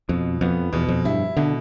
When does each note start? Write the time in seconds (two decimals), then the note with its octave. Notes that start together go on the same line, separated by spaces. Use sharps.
0.09 F2 B2
0.41 F2 B3
0.73 E2 B2
0.88 F2
1.05 G2 E4
1.37 B2 D3